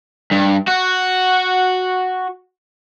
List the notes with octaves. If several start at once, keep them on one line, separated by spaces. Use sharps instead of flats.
G2
F#4